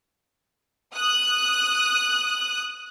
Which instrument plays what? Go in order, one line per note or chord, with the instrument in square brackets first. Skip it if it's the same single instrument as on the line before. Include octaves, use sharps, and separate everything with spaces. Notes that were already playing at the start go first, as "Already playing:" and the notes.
[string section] D#6 F#6